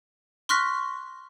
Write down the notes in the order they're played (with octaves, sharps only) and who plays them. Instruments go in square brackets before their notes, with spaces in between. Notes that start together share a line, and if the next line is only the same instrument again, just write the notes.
[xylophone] C6 C#6 F6 F#6 A#6 B6